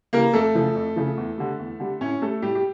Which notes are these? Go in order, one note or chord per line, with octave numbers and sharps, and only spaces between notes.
C#3 E3 G3 A#3 A#4
F2 A3 A4
C#3 F3
F2
C#3 F3
E2
D3 G3
E2
D3 G3
A2 C#4 C#5
G3 A3 A4
A2 G3 G4
G4